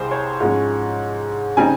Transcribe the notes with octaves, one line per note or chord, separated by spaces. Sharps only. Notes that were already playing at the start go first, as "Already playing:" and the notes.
Already playing: C2 C3 G3 G#4 C5
C#5
G#2 F3 G#3 C#4
C#3 G3 C4 D#4 G#5